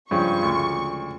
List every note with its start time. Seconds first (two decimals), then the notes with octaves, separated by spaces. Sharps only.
0.11 G2 C#3 F3 G#3 C#6
0.43 D2